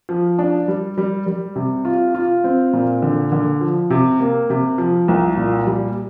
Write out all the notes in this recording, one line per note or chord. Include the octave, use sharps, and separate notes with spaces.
F3
D4
G3
G3
G3
C3
F4
F4
C4
A#2
D3
D3
F3
C3
A#3
C3
F3
C2
A#2
G3